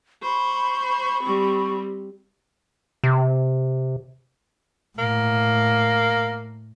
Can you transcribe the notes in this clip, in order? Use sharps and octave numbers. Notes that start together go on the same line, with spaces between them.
C5 B5 C#6
G3 C4
C3
A2 A#3